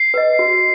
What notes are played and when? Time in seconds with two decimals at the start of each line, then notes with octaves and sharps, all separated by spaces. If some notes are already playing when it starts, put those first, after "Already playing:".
Already playing: C7
0.14 B4 D#5
0.39 F#4